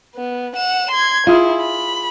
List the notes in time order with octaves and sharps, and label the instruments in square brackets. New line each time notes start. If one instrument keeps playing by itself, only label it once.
[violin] B3
F#5 E7
C6 G#6
[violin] E4 [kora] F4 G#4
[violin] B5